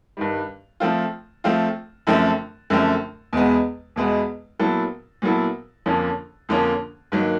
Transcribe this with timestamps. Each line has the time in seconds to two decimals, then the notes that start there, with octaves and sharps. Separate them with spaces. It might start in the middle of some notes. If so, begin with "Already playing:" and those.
0.17 G2 D#3 G3
0.80 F3 A3 C4 F4
1.44 F3 A3 C4 F4
2.07 F#2 D3 F3 A3 C4
2.70 F#2 D3 F3 A3 C4
3.33 E2 B2 G#3 B3
3.96 E2 B2 G#3 B3
4.59 A#2 F#3 B3 E4 A4
5.22 A#2 F#3 B3 E4 A4
5.86 F2 D3 F3 A#3 C#4
6.49 F2 D3 F3 A#3 C#4
7.12 G2 D#3 F#3 A#3